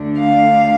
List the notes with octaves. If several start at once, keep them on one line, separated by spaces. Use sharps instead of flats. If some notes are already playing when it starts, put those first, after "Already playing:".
Already playing: D2 D3 A3 D4
F5